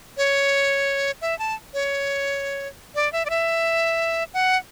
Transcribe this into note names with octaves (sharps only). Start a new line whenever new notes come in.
C#5
E5
A5
C#5
D5
E5
D5
E5
F#5